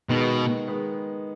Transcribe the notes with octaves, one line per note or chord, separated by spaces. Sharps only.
B2 D#3 G#3 B3
D#3 G#3 B3